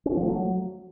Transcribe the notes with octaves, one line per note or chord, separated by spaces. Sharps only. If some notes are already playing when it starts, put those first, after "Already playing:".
C#4
C4
F3
A3
F#3